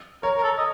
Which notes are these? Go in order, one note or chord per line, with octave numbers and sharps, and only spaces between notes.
A#4 C#5
A#4
A4
D#5